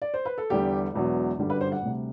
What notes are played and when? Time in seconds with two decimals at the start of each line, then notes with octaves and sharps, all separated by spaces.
0.02 D5
0.14 C5
0.25 B4
0.38 A4
0.50 E2 D3 G3 G4
0.94 E1 E2 B2 F#3
1.39 G1 F#2 D3 G3
1.50 B4
1.61 C5
1.72 F#5
1.82 D2 C3 G3